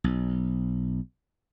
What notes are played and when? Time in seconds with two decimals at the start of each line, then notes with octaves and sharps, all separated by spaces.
0.04 B1